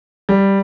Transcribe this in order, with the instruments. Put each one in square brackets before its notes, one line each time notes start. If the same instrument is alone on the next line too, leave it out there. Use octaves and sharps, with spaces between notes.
[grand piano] G3